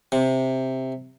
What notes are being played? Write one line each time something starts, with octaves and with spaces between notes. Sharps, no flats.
C3